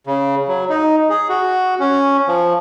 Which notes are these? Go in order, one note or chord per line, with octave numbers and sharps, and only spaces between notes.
C#3
F#3
D#4
G#4
F#4
C#4
F3